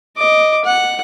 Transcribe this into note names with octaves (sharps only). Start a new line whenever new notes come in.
D#5 D6
F#5